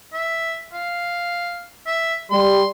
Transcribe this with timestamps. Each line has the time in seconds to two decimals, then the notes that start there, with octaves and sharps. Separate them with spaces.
0.14 E5
0.73 F5
1.86 E5
2.31 G3 C6